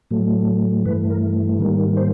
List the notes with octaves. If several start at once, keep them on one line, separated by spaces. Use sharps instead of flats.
A2 F#3 A3
G2 E3 A3 B4
A#4
G#2 D#3 G3 A#3
C5